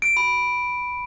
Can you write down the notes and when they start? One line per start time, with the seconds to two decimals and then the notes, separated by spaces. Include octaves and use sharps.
0.02 D7
0.17 B5